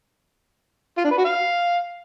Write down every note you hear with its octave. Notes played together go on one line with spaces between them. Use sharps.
F4
D4
B4
F#4
F5